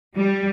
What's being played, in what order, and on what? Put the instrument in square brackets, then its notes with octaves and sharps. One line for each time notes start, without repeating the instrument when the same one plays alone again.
[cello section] G3